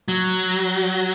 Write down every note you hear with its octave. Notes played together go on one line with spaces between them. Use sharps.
F#3